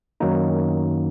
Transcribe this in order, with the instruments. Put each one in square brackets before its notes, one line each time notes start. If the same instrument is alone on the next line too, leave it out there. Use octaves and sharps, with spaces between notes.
[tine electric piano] F#2 D#3 F#3 A#3 D#4